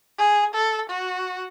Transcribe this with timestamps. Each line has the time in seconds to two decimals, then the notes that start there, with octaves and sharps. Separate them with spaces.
0.18 G#4
0.54 A4
0.90 F#4